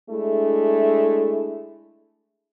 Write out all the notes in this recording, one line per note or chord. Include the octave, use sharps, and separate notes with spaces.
G#3 A3 D4 E4